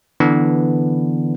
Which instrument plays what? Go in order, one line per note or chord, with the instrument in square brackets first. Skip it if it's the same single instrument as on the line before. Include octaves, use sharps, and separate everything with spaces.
[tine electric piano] D3 E3 B3 D4